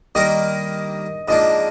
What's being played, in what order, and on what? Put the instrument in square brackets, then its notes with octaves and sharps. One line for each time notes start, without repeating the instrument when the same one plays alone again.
[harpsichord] D#3 G3 A#3 D#4 A#4 [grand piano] D#5
[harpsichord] G#2 F3 A#3 D4 [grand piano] D#5